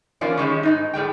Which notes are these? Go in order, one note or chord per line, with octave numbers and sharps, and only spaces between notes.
E3 F3 A#3 C#4 F4 D5
D#3 G3 G#3 C#4
G#2 B2 D#4
A2 G3 G#3 G5